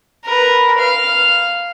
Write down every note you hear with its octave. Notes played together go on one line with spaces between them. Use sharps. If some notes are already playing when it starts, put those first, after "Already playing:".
A#4 B4
F5